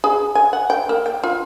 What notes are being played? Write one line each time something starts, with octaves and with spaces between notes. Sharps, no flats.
G#4
G#5
F#5
G5
A#3
G5
F4